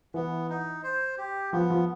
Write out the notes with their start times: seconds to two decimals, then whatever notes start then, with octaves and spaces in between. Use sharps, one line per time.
0.14 E3 B3
0.49 D#4
0.83 C5
1.18 G4
1.53 F3 B3
1.70 F3